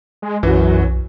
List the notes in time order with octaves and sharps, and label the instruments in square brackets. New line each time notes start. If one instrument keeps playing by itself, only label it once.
[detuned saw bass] G#3
[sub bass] B1 [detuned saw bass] F#2 [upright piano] E3 F#4